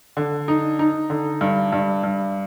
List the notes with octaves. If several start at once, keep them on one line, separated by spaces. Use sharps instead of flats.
D3
D#4
D#4
D3
G2
G2
G2